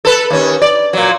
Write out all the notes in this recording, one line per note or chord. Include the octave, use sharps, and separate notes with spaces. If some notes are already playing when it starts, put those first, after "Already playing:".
A4 B4
D#2 C#4
D5
A#2 F#3